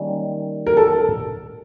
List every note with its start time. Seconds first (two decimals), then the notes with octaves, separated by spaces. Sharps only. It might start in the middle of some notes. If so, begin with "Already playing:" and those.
Already playing: D#3 G3 A#3 C#4
0.67 A#4
0.77 A4